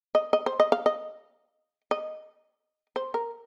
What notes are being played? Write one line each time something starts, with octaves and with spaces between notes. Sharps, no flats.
D#5
D#5
C5
D#5
F5
D#5
D#5
C5
A#4